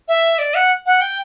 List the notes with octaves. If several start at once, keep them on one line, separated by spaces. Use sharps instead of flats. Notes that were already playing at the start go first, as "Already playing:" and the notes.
E5
D5
F#5
F#5
G5